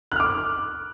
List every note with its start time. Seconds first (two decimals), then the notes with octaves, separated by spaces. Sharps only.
0.12 F#6
0.16 F6
0.20 D6